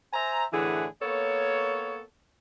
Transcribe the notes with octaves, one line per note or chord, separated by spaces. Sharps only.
C5 E5 G#5 A#5
A2 D3 E3 G#4 B4 F#5
A#3 B3 A4 C#5